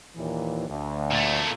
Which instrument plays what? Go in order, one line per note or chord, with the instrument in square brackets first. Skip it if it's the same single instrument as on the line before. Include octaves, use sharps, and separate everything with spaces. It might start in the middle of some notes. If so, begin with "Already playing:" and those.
[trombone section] D#2 A#2 E3
D2
[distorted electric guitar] A#2 A3